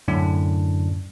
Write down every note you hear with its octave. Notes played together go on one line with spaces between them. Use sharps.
F#2 A2 D3 D4